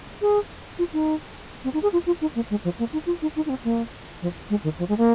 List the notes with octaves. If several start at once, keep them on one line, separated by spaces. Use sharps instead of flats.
G#4
F4
D#4
C4
D#4
G#4
F4
F4
D#4
A#3
G#3
F3
A#3
D#4
F4
D#4
D#4
D#4
C4
A#3
F3
G#3
D#3
F3
G#3
A#3